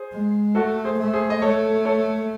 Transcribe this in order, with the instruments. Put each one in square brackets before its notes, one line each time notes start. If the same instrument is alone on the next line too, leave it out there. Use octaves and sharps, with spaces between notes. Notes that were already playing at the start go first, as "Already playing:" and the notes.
Already playing: [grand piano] G#4 C5
[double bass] G#3
[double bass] A3 [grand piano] F#4 A4
[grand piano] G#4 C5
[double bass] A3
[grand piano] G#4 C5
D#5
[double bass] A3 [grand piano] A4 C#5
[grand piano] A4 C#5